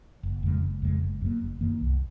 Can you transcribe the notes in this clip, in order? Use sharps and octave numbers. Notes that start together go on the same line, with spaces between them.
F#1
F2 C#3 G#3
F#1
F2 C#3 G#3
F#1
F#2 D#3 A#3
F#1
F#2 D#3 A#3
C2